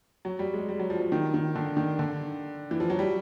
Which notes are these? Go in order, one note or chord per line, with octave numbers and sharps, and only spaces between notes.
F#3
G3
G#3
G3
F#3
F3
F3
D#3
D#3
D3
D#3
D3
E3
F3
F#3
G3